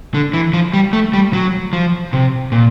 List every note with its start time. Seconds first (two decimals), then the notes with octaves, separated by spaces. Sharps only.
0.14 D3
0.33 E3
0.53 F3
0.74 G3
0.93 A3
1.13 G3
1.33 F#3
1.73 F3
2.13 C3
2.52 A#2